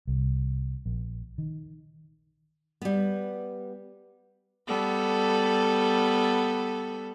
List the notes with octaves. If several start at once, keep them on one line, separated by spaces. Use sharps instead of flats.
C2
A#1
D#3
G3 B3
G3 B3 A4